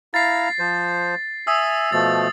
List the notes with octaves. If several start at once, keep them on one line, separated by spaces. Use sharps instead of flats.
E4 F5 A#5 A6 C7
F3 C5
E5 G#5 D#6 E6
B2 F3 A3 A6